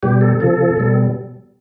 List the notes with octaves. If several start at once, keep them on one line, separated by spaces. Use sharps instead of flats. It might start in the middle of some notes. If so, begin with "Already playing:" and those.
B2 G3 G4
A4
C3 F3 A4
B2 G3